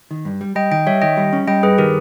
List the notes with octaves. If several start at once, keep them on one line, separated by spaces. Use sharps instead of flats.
D#3
G2
G3
G3 D#5 G5
D#3 D#5 G5
G3 C#5 E5
D#3 D#5 G5
G3
C#4
G3 D#5 G5
G2 G#4 B4
D#3 G4 A#4